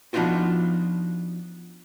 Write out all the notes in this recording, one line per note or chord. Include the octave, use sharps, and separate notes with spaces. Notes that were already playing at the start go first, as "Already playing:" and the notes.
F3 B3 D4 D#4 F4 F#4